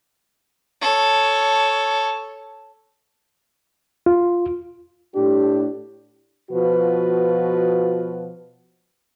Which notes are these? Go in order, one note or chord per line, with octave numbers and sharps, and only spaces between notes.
A4 C#5
F4
A2 D4 G4
B2 F3 F4 F#4 B4